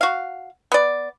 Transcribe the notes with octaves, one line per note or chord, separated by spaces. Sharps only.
F#4 F5
B3 D5